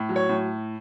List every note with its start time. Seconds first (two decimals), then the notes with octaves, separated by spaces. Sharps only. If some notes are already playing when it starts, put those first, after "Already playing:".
Already playing: A2
0.09 F#3
0.16 C#5
0.29 A2